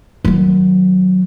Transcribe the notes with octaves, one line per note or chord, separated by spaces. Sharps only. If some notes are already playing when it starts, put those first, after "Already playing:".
D#3 F#3